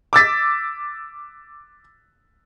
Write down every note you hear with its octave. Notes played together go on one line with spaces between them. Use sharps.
D6 E6 A6 B6